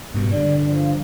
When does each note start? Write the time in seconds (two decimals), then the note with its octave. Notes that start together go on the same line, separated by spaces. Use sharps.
0.14 G#2 B2 G3
0.32 G2 D3 D5
0.67 F3